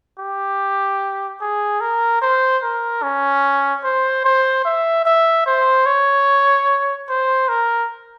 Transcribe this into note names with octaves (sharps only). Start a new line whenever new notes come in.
G4
G#4
A#4
C5
A#4
C#4
C5
C5
E5
E5
C5
C#5
C5
A#4